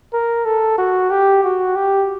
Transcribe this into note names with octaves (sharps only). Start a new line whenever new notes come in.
A#4
A4
F#4
G4
F#4
G4